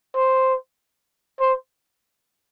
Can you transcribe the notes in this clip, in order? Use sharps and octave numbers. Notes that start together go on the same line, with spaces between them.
C5
C5